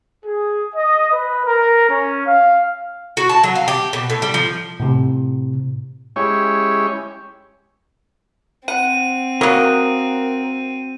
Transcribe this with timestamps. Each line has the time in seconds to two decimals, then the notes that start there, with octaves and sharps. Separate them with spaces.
0.25 G#4
0.75 D#5
1.11 B4
1.44 A#4
1.89 C#4
2.26 F5
3.17 F#4
3.29 A5
3.43 F#3
3.55 F5
3.68 G4
3.93 B2
4.10 A2
4.22 G3
4.34 F3
4.80 A2 C3
6.16 G#3 C#4 E4 G4 C#5
8.68 C4 F#5 D#7
9.41 F#3 A#3 A#4 D#6 F#6